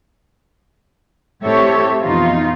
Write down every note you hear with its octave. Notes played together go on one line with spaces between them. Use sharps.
A2 C4 G4 A4 C#5 E5
F2 B2 E3 D#4 F4